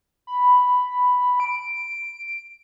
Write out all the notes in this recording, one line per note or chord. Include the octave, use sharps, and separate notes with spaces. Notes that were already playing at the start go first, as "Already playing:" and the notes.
B5
D7